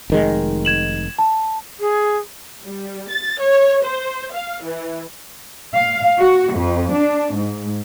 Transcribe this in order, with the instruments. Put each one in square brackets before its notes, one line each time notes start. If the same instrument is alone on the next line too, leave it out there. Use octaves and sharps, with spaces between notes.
[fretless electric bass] F1 D#3 G#3
[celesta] G#6 E7 F#7
A5
[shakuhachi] G#4
[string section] G3
A6
C#5
C5
F5
E3
[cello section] F5
F#4
F2
D4
G#2